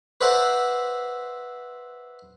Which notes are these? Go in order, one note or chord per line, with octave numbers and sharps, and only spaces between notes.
B4 C5 D5 E5 F#5 A#5